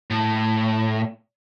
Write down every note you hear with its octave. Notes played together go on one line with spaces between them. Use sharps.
A2